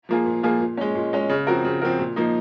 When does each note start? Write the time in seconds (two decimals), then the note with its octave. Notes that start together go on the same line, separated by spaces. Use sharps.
0.09 F3 A#3 F4 G#4
0.26 A#2
0.43 F3 A#3 F4 G#4
0.61 A#2
0.77 G#3 C#4
0.95 A#2
1.13 G#3 C#4
1.29 C#3
1.47 F3 C4 F#4 A#4
1.65 C#3
1.81 F3 C4 F#4 A#4
1.99 A#2
2.16 F3 A#3 D#4